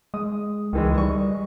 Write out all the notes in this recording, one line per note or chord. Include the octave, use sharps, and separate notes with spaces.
G#3 D#6
C#2 D#3 E3 G#3
G3 C#6
D#5